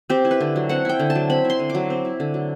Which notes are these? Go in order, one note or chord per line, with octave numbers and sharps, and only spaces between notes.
C4 G4
E4
B4
D3
F#3
C4 F#5
E4 G5
D3
A5
F#3
C4 B5
E4
C6
D3
D6
F#3
C4
E4
D3
F#3